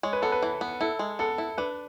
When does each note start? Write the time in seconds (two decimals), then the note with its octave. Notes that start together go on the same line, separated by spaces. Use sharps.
0.03 G#3 C#5
0.13 B4
0.22 B3 A4
0.32 B4
0.42 E3
0.61 B3
0.81 E4 A4
0.99 G#3
1.19 B3 A4
1.38 E4
1.58 D4 B4